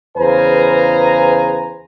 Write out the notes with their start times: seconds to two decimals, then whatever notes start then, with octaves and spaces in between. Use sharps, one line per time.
0.17 E2 C#3 B4 C5 G#5 A#5